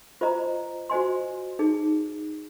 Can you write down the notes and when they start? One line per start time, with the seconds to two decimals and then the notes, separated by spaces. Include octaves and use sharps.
0.21 F4 C5 D#5 A#5
0.90 F#4 C5 D#5 G#5 C6
1.59 D#4 G#4